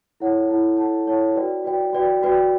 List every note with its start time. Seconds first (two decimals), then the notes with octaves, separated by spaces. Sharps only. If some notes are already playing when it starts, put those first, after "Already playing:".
0.20 E4 A4 C#5 F#5 A5
0.49 E4 A4 C#5 F#5 A5
0.77 E4 A4 C#5 F#5 A5
1.07 E4 A4 C#5 F#5 A5
1.35 F#4 B4 D5 G5
1.64 F#4 B4 D5 G5
1.93 F#4 B4 D5 G5
2.23 F#4 B4 D5 G5